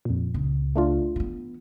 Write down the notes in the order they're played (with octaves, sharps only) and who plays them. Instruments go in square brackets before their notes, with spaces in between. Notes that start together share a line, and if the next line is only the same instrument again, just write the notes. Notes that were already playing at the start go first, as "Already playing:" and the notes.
[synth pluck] F2 A#2
[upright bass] C#2
[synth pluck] A3 D4 F4
[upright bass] E3 B3